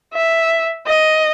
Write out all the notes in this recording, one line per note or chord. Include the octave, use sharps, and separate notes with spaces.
E5
D#5